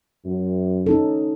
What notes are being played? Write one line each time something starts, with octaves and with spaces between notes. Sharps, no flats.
F#2
C#4 D#4 A4